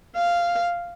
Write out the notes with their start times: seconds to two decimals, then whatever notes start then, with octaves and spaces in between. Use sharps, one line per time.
0.16 F5